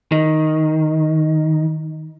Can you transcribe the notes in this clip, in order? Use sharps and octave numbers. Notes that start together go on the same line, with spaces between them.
D#3